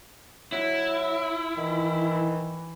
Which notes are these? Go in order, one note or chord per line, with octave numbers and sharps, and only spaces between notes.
F#3 E4
D#3 E3